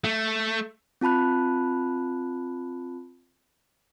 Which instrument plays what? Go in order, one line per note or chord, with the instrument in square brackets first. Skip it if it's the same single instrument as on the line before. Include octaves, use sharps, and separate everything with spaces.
[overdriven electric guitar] A3
[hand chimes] C4 F4 A5 B5 F#6